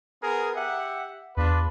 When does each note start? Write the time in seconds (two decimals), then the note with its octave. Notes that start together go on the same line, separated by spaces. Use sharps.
0.23 B3 G#4 A#4
0.55 G4 E5 F#5
1.37 E2 D4 F4 B4